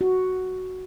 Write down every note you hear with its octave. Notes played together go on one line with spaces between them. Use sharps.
F#4